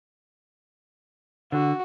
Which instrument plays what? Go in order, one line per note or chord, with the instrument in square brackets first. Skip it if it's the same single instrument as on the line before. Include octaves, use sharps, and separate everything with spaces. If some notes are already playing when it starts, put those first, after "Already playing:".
[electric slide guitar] D3 [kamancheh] F#4